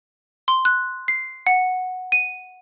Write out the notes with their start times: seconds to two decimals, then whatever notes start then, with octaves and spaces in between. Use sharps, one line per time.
0.48 C6
0.65 F#6
1.08 C7
1.47 F#5
2.12 D#7